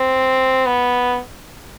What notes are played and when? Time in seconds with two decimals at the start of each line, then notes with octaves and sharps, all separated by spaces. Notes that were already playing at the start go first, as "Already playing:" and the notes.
Already playing: C4
0.66 B3